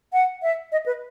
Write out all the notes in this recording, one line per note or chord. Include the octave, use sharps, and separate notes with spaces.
F#5
E5
D#5
B4